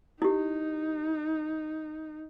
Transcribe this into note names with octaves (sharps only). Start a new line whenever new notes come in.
D#4 E4 G4